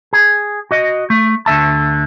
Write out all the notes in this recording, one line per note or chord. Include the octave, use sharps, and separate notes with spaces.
G#4
F#4 D#5
A3
D2 D3 E5 A5